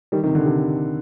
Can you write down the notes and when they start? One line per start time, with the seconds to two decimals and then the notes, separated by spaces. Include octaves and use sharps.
0.12 D#3 G3
0.23 C3 D#3
0.35 D3
0.45 C3 D#3